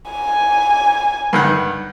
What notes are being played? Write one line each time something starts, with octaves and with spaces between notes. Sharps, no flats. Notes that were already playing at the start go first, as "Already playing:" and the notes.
G#5
G2 D#3 F#5